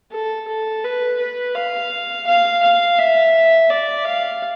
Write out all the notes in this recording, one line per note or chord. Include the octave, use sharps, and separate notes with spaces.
A4
A4
B4
B4
F5
F5
F5
E5
D5
F5